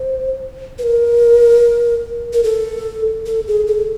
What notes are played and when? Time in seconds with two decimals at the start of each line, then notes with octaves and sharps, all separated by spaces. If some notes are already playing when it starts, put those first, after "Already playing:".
Already playing: C5
0.79 B4
0.83 A#4
2.33 A#4
2.43 A4
3.26 A4
3.47 G#4
3.67 A4